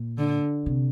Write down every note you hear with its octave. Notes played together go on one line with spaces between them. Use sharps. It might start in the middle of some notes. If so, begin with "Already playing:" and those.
Already playing: A#2
D3
C3